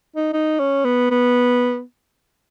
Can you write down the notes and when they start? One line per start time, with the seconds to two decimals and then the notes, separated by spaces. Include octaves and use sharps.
0.16 D#4
0.33 D#4
0.59 C#4
0.85 B3
1.11 B3